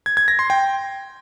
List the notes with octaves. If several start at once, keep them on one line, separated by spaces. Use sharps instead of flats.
G#6
G#6
A#6
C6
G5